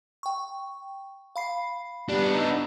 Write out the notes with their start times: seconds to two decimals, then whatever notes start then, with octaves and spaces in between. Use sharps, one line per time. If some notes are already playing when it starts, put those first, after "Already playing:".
0.23 G5 C#6
1.36 F5 B5 C7
2.09 G3 B3 D4
2.34 D#4 E6